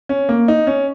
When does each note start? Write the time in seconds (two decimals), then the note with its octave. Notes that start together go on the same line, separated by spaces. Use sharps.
0.09 C#4
0.29 A#3
0.48 D#4
0.67 C#4